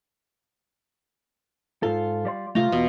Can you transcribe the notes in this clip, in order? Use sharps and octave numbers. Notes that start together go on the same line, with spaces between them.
G#2 F4 A4
G3 D5 C6
C3 G3 A3 F4 A#5
E2 B2